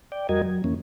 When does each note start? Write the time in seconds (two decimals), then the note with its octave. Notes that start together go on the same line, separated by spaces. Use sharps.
0.12 D5 G5
0.29 F2 G3 F#4 A#4 D#5 G#6
0.42 F#3
0.64 F2 E3 A#3 C#4